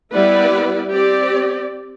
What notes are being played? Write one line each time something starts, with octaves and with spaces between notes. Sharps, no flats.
G3 B3 E4 B4 D5
C4 G4 D5